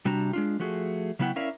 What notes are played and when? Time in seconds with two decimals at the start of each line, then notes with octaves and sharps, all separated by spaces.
0.05 C3 G3 D4 F#4 A#5
0.33 G#3 D4 F4
0.59 F3 A3 F#4 G#4
1.19 C#3 F#3 B3 E4 F#5 G5
1.36 C#4 E4 A#4 D5 E5 F5